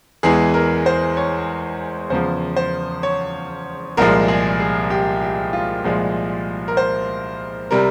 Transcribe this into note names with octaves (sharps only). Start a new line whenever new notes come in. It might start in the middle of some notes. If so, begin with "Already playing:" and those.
E2 E3 G#3 G#4
A#4
C5
C#5
E2 C#3 F3 C5
C5
C#5
C2 A#2 F3 G#3 A#4
G#4
G#4
G4
G4
F4
C2 A#2 F3 G#3
A#4
C5
C3 G3 A#4